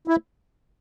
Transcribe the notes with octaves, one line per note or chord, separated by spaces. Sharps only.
E4